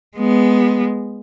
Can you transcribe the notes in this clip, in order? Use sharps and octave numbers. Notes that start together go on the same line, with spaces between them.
G#3 B3